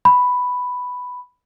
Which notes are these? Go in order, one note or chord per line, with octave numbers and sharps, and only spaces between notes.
B5